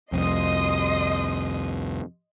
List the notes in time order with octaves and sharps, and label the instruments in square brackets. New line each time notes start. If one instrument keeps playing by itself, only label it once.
[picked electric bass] C2 F2 [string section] D#5 C6 D#6